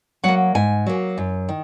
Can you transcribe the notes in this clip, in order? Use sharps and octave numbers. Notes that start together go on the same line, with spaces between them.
F#3 A#3 F#5
G#2 G#5
F#3 A#3
F#2
D#3